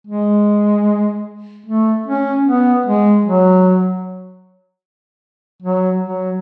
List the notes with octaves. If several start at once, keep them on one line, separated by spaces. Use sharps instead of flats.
G#3
A3
C#4
B3
G#3
F#3
F#3
F#3